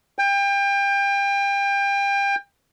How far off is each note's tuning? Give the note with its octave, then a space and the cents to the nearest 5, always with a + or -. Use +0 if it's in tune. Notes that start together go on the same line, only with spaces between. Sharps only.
G5 +30